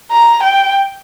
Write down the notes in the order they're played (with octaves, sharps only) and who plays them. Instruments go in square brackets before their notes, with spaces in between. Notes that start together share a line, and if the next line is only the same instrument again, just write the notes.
[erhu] A#5
G5